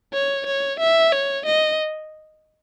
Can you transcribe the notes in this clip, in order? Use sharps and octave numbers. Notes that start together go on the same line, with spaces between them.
C#5
C#5
E5
C#5
D#5